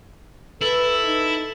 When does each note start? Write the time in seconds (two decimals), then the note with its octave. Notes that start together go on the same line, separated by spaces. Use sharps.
0.61 E4 A4 B4
1.05 D#4